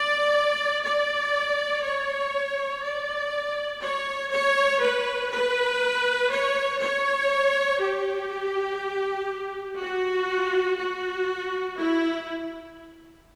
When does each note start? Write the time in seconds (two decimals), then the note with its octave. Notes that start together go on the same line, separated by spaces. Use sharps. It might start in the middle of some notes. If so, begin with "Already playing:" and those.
Already playing: D5
0.84 D5
1.84 C#5
2.83 D5
3.82 C#5
4.32 C#5
4.82 B4
5.31 B4
6.31 C#5
6.81 C#5
7.81 G4
9.80 F#4
10.79 F#4
11.78 E4